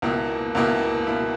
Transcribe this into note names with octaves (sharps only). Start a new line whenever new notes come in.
C#2 B2 A#3 E4
C#2 B2 A#3 E4
B2 A#3 E4